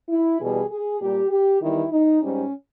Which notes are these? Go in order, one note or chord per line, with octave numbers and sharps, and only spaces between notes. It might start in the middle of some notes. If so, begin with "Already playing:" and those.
E4
E2 B2 G3 G#4
G#4
A#2 G3 G4
G4
E2 D#3 G3 E4
D#4
G#2 G3 C#4